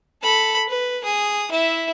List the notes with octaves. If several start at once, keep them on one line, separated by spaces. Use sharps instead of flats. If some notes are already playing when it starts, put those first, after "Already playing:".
A4 B5
B4
G#4 D#6
E4 E5